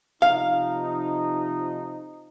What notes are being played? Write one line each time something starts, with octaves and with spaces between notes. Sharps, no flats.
C3 F3 D#4 F5